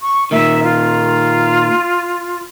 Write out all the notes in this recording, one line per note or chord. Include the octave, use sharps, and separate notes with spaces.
C#6
A#2 D#3 E5
F4